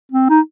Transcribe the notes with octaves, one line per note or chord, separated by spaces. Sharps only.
C4
D#4